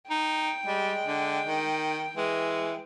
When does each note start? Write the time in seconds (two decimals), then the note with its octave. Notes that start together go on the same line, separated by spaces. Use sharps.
0.10 D#4 G5
0.66 G3 G#3
1.06 D3
1.47 D#3
2.16 E3 G#3